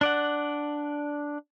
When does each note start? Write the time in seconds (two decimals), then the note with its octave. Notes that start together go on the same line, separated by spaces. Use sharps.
0.01 D4 D5 F#5